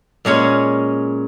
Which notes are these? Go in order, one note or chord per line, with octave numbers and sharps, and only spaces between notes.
A#2 G#3 C#4 C#5